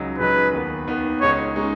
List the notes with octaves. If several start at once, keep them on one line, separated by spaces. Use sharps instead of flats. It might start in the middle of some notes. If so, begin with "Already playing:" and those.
Already playing: C#2 C#3 F#3 D#4
C#2 C#3 F#3 D#4 B4
D#2 D#3 B3
D#2 D#3 B3
C#2 C#3 G#3 D#4 C#5
C#3 G#3 D#4